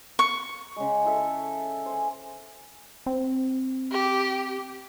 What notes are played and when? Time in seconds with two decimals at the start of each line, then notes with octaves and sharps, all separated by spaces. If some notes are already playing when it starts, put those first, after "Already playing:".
0.19 C#6
0.76 C#3 G#3
1.05 E4 A4 E5
1.86 C5 G#5
3.06 C4
3.92 G4